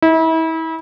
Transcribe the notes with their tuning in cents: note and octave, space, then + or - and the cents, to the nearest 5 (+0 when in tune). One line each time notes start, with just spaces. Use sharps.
E4 -35